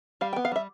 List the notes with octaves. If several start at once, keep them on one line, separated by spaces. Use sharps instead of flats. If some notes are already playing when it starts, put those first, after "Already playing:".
G3 F5
G5
B3
F5
G3 E5